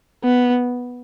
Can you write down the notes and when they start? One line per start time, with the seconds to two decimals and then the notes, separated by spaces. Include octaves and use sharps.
0.24 B3